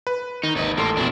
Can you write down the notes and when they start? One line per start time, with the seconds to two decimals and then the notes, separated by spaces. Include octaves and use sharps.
0.07 B4
0.43 D#3 D#4
0.55 G#1 D#2 B4 D#5
0.77 A1 A#3 A4 C6
0.97 F2 B2 D4 E4